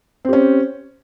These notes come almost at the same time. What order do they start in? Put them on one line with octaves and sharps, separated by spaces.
C4 G4 C#4